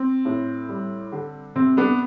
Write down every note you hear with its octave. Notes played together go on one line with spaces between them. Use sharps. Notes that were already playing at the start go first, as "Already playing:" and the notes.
Already playing: C4
A2
G3
D3
C3 C4
B3 D4